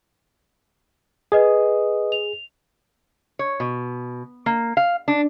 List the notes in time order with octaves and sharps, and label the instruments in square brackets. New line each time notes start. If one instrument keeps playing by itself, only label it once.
[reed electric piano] G#4 [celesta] B4 D#5 D#6
[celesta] F7
[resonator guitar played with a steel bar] C#5
B2
A#3
F5
D4